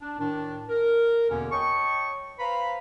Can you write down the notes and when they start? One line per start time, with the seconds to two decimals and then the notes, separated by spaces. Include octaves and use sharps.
0.02 D4
0.19 A2 D#3 D4
0.68 A#4
1.29 E2 B2 D3 A#3 C#4
1.51 C#5 D#5 G5 A5 C#6
2.39 B4 C5 F5 A#5 B5